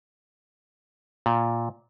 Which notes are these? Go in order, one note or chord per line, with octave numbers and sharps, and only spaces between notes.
A#2